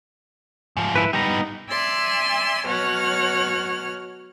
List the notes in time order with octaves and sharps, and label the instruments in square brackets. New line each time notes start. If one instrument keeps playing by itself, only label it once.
[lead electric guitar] G#2 F3
[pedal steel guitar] E4 B4
[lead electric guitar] G3 B3 [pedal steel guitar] D#4 A#5
[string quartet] D5 E5 G#5 C6 E6
B2 F#3 C#5 F#5 F6